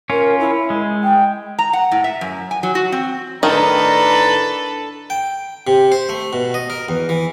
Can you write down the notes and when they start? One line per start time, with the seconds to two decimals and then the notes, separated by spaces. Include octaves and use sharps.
0.10 C#4 F4 A#4
0.39 E4
0.70 G#3
1.03 G5
1.59 A#5
1.73 F#5
1.92 A2
2.04 E5
2.21 F#2
2.51 G#5
2.63 F#3
2.75 F#4
2.92 C4
3.43 A2 D#3 D4 A4 B4 A#5
5.10 G5
5.67 C3
5.92 C5
6.09 A3
6.33 B2
6.54 D#5
6.70 A#4
6.89 E2
7.09 E3